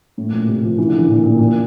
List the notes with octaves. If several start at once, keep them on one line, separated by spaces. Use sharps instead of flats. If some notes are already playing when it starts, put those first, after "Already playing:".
A2
A#2
C3
F3
E3
D3
E3
A#2
A#2
A#2